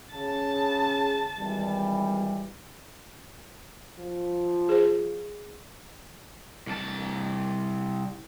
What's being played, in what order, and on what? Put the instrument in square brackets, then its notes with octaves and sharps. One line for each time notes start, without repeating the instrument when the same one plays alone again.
[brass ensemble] C#3 [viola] A5
[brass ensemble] G#1 E3 G3
[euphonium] F3
[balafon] G#4 C5
[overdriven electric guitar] C2 A5